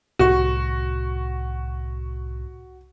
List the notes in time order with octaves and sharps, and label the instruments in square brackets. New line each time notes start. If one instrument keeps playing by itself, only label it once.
[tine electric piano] C2 A2 C#6 [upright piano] F#4